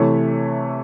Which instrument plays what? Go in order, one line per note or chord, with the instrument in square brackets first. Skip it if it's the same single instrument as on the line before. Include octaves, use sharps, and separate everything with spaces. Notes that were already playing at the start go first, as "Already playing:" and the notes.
Already playing: [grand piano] C3 E3 A3 C#5